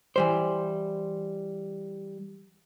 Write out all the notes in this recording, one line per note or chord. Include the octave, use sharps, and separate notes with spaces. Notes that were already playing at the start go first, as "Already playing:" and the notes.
E3 G3 C5